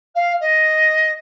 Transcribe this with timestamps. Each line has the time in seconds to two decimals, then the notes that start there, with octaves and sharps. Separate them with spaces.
0.15 F5
0.40 D#5